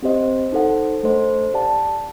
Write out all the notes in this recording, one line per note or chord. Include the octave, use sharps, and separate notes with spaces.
C4 G4 C5 D#5
D#4 A4 C5 F#5
A3 D4 A4 C5 D#5
G4 D5 F#5 A5